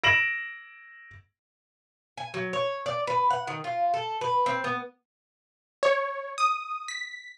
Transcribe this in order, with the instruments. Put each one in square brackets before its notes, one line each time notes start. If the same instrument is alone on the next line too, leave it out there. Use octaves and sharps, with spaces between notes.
[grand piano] A#6 D7 E7 F#7
[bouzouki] G#5
F#3
C#5
D5
B4
F#5
D#3
F4
A4
B4
C4
B3
[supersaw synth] C#5
D#6
B6